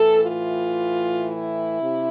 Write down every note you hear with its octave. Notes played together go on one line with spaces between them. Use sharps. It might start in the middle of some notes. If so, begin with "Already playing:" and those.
Already playing: A2 E3 A4
F4
E4
C3